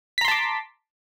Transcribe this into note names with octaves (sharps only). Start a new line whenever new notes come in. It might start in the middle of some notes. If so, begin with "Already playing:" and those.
A5 A#5 C6 D6 B6